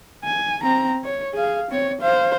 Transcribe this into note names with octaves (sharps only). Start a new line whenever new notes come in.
G#5
C4 A#5
C#5
G#4 F5
C4 C#5
C5 F5